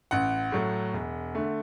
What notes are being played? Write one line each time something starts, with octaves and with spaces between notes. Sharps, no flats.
A1 F#5
A2 F#3 A3
E1
D3 A3